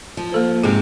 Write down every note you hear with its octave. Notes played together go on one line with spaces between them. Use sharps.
F3
A#3 A4 C5
G#2 C3 G4 G#4